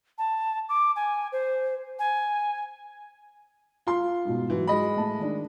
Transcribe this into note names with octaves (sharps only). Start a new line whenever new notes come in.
A5
D6
G#5
C5
G#5
F4 C6
G#2 B2
G#2 E3 F#3
G#3 D#5 B5
A2 A3 A5
D#3 D4